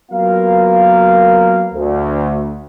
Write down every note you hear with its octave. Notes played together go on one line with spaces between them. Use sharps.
F#3 A#3 B3 F4 A#4 F5
D2